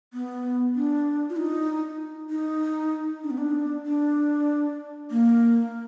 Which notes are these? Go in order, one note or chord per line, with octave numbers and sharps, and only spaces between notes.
B3
D4
F4
D#4
D#4
D4
B3
D4
D4
A#3